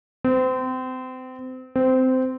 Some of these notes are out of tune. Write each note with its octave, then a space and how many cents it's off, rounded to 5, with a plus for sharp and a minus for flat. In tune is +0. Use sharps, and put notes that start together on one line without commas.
C4 -30
C4 -15